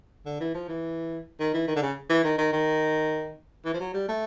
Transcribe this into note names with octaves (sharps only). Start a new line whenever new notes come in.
D3
E3
F3
E3
D#3
E3
D#3
D3
C#3
E3
D#3
D#3
D#3
E3
F3
F#3
G3
A3